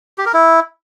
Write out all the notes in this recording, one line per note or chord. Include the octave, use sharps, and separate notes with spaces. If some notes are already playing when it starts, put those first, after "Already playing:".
G4
A#4
E4